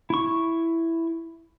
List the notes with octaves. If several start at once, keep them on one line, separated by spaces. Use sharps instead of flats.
E4 C#6